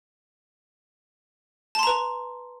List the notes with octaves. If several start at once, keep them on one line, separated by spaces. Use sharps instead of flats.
B4 A5 A#5 C6